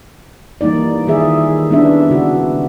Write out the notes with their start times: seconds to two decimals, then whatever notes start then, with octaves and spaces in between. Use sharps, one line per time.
0.61 E3 G3 A#3 D#4 D5
1.07 D#3 E4 F4 G#4 E5
1.70 G3 B3 C#4 D4 E4 E5
2.10 C#3 F#4